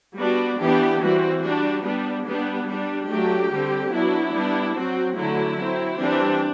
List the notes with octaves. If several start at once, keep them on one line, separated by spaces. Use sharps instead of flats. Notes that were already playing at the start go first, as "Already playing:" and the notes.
G3 B3 D4 F#4
E3 B3 D4 G4
E3 G3 C4 F#4
G3 D4 F#4
G3 B3 D4
G3 B3 D4
G3 D4
F#3 A3 D4 G4
D3 G3 C4
F#3 B3 D4 E4
G3 B3 D4
F#3 C4 F#4
D3 F#3 A3 E4
F#3 C4
E3 G3 C4 D4